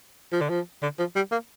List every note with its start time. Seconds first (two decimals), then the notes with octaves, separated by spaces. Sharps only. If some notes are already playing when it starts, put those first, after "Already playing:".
0.32 F3
0.41 D3
0.49 F3
0.82 D3
0.99 F3
1.16 G3
1.32 A#3